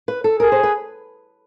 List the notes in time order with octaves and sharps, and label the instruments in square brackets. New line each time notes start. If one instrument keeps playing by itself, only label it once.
[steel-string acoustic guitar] B4
A4
[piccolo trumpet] G#4 [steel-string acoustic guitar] A#4
[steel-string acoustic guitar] C5
B4